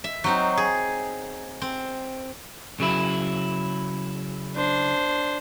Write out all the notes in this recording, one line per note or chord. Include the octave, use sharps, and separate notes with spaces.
E5
F#3 C4 D#4
G#4
C4
C#3 F#3 E4
D4 C5